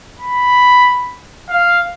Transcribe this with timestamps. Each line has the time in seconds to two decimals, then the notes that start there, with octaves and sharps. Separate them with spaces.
0.20 B5
1.49 F5